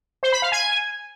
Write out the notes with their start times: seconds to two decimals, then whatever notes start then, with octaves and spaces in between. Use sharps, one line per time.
0.23 C5
0.32 B5
0.42 F5
0.52 G#5